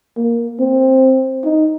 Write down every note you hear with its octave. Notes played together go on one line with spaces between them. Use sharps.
A#3
C4
D#4